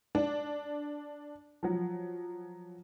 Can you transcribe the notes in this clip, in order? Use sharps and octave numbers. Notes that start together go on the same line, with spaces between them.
D4
F3 F#3